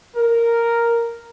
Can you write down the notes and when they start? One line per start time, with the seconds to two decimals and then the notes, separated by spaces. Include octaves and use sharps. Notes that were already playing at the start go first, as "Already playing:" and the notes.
0.16 A#4